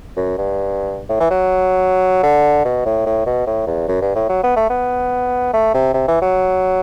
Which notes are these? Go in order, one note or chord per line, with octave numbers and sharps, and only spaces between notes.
F#2
G2
A2
E3
F#3
D3
B2
A2
A2
B2
A2
E2
F#2
G2
A2
F#3
B3
A3
B3
A3
C3
C3
E3
F#3